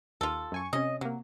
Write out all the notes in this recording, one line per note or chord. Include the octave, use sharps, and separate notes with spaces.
D#2 F4 A4
F#2 G#5 C#6
C3 C#4 D#5
C3 F#3 A#3